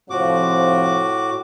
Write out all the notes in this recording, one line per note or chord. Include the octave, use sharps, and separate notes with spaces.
F2 A2 C3 F3 F#4 D6